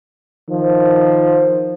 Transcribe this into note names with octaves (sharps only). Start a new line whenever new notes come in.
D#3 F3